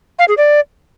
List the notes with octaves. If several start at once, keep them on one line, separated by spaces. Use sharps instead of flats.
F5
G#4
D5